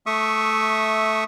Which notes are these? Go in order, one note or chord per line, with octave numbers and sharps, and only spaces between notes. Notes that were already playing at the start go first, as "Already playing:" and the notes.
A3 E5 C#6 D#6